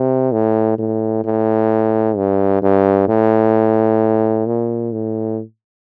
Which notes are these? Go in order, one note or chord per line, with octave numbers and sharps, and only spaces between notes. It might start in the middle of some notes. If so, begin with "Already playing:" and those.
Already playing: C3
A2
A2
A2
G2
G2
A2
A#2
A2